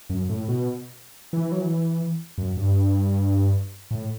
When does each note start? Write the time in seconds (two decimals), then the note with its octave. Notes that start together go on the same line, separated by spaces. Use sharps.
0.10 F#2
0.29 A2
0.48 B2
1.33 E3
1.52 F#3
1.62 E3
2.38 F#2
2.57 G2
3.91 A2